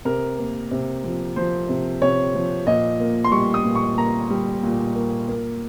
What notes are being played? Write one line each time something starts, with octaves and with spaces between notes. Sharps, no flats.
C3 A#4
A#3
C3
F3
F3 C5
C3
C3 C#5
F3
A#2 D#5
A#3
C6
G3 C#6
D#6
A#2
C#6
A#3 A#5
G3
A#2
A#3
A#3